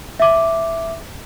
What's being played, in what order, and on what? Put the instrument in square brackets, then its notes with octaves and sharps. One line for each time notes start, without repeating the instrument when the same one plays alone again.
[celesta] E5 D6